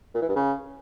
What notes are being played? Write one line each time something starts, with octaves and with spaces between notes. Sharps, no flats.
A#2
E3
G2
C#3